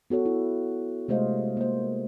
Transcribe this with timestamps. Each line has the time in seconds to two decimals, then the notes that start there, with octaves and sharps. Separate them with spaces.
0.10 B3 F#4 A4 C#5
0.26 E4
1.08 C3 G#3 A3 C5 D#5 F5
1.57 A#3 C5